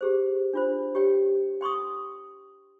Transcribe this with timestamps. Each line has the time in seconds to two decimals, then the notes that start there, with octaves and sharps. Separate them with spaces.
0.01 G4 G#4 C5
0.53 D4 F4 C5
0.95 G4 C#5 G5
1.61 G5 C6 C#6 D#6